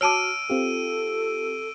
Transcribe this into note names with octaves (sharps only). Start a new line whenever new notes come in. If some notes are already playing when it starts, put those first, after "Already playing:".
F#4 C#5 A5 D6 E6 F6 D7 D#7
C4 F4 G4 A4